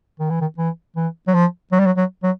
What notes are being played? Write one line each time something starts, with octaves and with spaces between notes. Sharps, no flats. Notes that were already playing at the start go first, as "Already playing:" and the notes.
D#3
E3
D#3
E3
E3
F#3
F3
F#3
G3
F#3
F#3
F#3